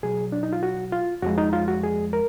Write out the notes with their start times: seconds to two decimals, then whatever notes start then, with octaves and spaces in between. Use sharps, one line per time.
0.03 B2 F#3 G#4
0.32 D4
0.43 D#4
0.53 F4
0.63 F#4
0.92 F4
1.22 F2 F3 G#3 F#4
1.38 D#4
1.53 F4
1.68 F#4
1.83 G#4
2.13 A#4